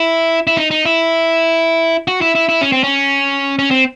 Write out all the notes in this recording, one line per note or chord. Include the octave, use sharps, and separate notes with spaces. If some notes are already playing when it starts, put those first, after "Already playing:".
Already playing: E4
E4
D#4
D#4
E4
F#4
E4
E4
E4
C#4
C4
C#4
C#4
C4